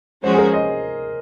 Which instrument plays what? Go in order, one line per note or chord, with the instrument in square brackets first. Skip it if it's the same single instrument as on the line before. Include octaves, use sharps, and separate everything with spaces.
[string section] F3 G#3 C#4 F#4 [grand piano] C5
[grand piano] G#4
A#4
D#5